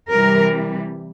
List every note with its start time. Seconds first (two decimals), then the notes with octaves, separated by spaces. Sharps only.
0.12 C3 E3 G3 A#4